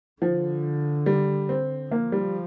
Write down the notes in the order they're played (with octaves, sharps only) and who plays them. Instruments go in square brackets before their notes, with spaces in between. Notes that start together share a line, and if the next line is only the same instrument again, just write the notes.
[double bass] D3 [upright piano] F3
[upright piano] G3
C4
[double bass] F3 [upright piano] A#3
[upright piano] G3